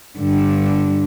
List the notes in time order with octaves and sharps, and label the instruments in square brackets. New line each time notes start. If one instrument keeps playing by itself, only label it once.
[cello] G2 D3